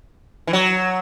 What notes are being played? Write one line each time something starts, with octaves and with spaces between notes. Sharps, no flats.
E3
F#3